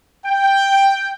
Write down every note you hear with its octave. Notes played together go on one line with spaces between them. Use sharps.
G5